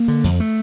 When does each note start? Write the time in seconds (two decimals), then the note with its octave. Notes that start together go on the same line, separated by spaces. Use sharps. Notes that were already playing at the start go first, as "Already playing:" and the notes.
Already playing: A#3
0.08 D3
0.24 F2
0.40 A3